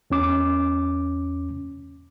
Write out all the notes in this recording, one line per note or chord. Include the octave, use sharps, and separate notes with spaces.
E2 C#4 D6